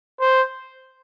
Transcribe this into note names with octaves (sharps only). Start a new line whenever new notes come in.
C5